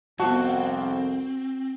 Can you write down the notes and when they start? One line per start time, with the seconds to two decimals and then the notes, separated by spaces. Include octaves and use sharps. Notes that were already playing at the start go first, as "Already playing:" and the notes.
0.19 C2 F2 B3 C4 F4 F#4 A5